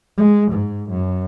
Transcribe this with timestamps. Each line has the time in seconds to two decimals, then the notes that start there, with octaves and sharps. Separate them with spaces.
0.18 G#3
0.51 G#2
0.90 F#2